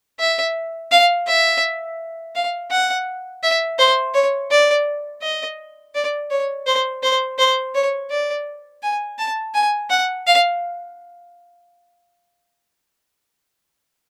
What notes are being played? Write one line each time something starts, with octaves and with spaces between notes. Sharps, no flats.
E5
F5
E5
F5
F#5
E5
C5
C#5
D5
D#5
D5
C#5
C5
C5
C5
C#5
D5
G#5
A5
G#5
F#5
F5